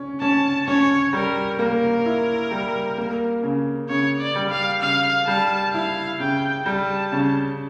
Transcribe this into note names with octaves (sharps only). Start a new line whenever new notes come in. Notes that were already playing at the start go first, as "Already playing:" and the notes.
Already playing: C#4
C#4 A5
C#4 C#5
G3 A#4
A#3 A#4
E4
G3
A#3
C#3
C#3 C#5
D5
G3
F5
C#3 F5
G3 A5
E4 F5
C#3 G5
G3 A5
C#3